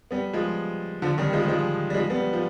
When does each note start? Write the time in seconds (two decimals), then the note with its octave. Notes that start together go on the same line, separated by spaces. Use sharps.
0.11 G3 B3
0.33 F3 G#3
1.02 D3 F3
1.18 D#3 G3
1.33 F3 G#3
1.48 F3 G#3
1.90 G3
1.94 F3 G#3
2.10 G3 B3
2.33 F3